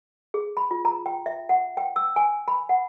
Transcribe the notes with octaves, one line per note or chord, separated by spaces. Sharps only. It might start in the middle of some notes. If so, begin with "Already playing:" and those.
G#4
B5
F4
A#5
G5
E5
F#5
G5
E6
G#5
B5
F#5